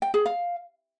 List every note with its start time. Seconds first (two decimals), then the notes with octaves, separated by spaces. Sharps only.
0.02 G5
0.14 G#4
0.26 F5